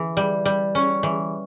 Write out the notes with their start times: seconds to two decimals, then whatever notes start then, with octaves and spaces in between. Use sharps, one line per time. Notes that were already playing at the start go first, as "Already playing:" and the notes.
Already playing: E3
0.17 G3
0.46 G3
0.75 C#4
1.03 E3